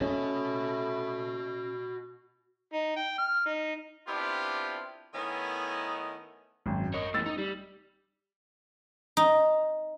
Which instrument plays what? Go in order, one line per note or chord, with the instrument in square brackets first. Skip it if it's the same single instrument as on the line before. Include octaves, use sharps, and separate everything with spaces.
[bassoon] A3 [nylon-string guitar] C#4 [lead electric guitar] F#4 D#5
[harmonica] D#4
G5
F6
D#4
[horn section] B3 C4 D4 E4 F4 G4
D#3 A3 B3 C#4 D#4 E4
[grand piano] G#1 F#2
[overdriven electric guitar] A#4 C#5 [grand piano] D#5
[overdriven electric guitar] E2 A2 [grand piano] E6 A6
[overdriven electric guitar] D#4
G3
[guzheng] D#4